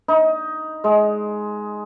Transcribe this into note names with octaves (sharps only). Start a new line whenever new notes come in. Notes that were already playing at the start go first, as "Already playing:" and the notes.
D#4
G#3